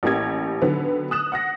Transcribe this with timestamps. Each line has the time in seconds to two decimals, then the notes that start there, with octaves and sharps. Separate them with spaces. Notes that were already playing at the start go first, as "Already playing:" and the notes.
0.03 A1 E3 A#3 G4 G#6
0.62 D3 D#3 F#3 B3
1.11 D#6 F#6 E7
1.32 F#5 F#6 A#6